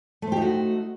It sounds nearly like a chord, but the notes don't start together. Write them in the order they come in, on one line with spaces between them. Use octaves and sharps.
A3 C5 G4 D#4 F#4